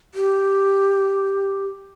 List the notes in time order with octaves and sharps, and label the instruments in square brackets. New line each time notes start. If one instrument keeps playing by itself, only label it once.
[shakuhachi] G4